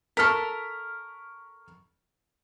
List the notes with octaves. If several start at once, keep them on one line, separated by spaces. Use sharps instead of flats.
A4 A#4 C#6 F6 B6